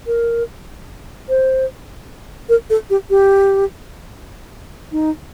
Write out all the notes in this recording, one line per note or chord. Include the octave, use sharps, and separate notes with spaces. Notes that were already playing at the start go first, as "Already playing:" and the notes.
A#4
C5
A#4
A4
G4
G4
D#4